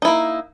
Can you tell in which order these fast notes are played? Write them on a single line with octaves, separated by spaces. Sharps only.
D#4 E4 A#3